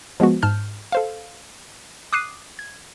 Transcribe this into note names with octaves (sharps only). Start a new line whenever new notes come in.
F3 G#3 B3 F#4
G#2 A5 F6 G6
A4 C5 F5
D6 D#6 F#6 C7 D#7
G#6